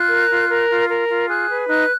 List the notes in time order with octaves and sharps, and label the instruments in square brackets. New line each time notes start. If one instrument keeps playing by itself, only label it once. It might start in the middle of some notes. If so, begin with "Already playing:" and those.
Already playing: [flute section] F4 F#6
A#4
F4
A#4
F4
A#4
F4
G#4 F#6
B4
D#4 F#6